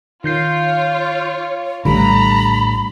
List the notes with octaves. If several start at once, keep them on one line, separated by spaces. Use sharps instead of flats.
D#3 F4 C#5 G6 C7
A#1 A2 D3 E3 G3 A#5 B5